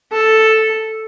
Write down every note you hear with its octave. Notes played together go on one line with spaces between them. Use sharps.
A4